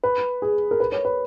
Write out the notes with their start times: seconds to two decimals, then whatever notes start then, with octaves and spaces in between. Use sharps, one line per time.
0.04 B4
0.42 G#4
0.71 A#4
0.80 B4
0.92 C#5
1.05 B4